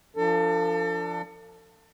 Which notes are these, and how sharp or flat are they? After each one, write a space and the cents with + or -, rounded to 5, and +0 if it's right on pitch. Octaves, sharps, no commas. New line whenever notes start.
F3 -15 D4 +0 A4 +35